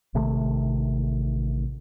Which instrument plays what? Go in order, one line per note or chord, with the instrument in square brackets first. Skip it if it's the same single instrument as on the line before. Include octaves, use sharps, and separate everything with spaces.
[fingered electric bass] A1 C3 D#3 A3